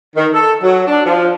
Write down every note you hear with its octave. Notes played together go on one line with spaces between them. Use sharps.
D#3
A4
F#3
D4
F3